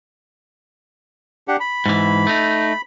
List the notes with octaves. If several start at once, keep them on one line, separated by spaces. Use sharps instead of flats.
D4 G4 F#5
B5
G#2 E3
A3 D#4